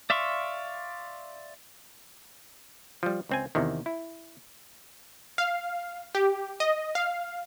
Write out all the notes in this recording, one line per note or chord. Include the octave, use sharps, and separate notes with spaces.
D5 E5 F5 C6 C#6
F3 G3
C#2 C4 G#5
E2 C3 D#3
E4
F5
G4
D#5
F5